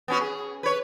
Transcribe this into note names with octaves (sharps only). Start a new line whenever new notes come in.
B3 C#4 F#4
G#4
B4 C#5